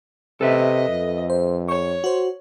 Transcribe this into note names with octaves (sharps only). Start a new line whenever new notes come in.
C3 A4 B4 D#5 E5
F2
C5
C#5 C#6
F#4 C5